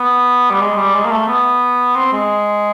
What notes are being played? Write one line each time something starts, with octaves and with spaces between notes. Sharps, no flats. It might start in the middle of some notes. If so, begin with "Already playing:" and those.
Already playing: B3
G3
G#3
G3
G#3
A#3
A3
B3
C4
G#3